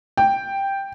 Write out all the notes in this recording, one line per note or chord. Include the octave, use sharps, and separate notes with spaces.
G5